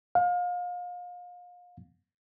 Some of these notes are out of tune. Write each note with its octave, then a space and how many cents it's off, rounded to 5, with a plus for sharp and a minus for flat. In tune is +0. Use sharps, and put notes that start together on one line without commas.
F5 +35